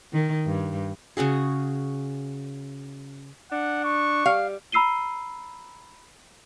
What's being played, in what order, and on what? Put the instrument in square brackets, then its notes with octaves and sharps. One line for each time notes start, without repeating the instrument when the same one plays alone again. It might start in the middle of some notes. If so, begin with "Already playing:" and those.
[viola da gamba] D#3
G2
[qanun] C#3 C#4 F#4 G#4
[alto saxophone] D4 [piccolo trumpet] F#5
[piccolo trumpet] C#6
[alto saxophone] G3 [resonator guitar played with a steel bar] F5
[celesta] A#5 B5 E6 C7 D#7 G7